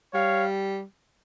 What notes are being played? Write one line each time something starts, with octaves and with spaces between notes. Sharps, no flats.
G3 C#5 F5